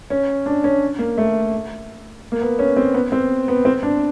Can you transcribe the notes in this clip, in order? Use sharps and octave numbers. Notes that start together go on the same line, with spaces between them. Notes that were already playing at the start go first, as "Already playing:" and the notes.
C#4
D4
C#4
A#3
A3
A#3
B3
C#4
C4
B3
C4
B3
C4
D4